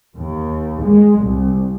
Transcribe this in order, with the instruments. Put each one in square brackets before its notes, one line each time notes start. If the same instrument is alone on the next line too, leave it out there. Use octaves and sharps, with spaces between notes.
[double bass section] D#2
G#3
C2